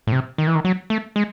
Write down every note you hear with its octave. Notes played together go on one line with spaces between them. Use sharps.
A2
C3
D#3
E3
D#3
F#3
A3
G#3